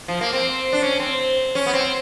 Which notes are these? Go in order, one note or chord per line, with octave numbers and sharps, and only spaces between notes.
F3
A#3
C4
D4
C#4
C4
C#4
B3
C4